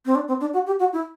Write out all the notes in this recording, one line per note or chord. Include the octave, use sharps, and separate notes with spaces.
C4
D4
C4
D4
F#4
G4
F#4
E4